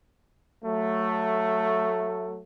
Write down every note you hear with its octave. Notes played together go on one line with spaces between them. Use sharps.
F#3 A3